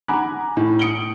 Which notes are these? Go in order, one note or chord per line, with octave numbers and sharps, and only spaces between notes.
F#5 G#5 A#5 B5 D6 F#6
A2
D#6 C#7 D7 F#7 G7